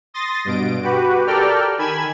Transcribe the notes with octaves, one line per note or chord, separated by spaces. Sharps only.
C6 D#6 A6 A#6
G2 B2 D7
F#4 G4 B4
G4 A4 A#4 D5 G5 F6
D#3 G#5 B5 G#6 E7